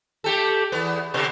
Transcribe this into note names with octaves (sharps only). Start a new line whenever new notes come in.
A3 G4 A4
E2 B3
B2 D3 B3